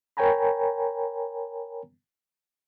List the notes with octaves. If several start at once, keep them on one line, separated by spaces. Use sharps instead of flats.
A#4 C#5 G5 G#5 A#5 B5